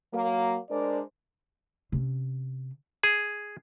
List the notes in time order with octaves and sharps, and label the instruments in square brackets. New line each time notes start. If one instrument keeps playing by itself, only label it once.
[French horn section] F#3 A#3
G#3 D4 A#4 C5 D5
[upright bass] C3 C#4
[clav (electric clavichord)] G#4